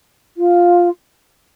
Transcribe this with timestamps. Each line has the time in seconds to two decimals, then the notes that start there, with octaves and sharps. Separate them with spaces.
0.37 F4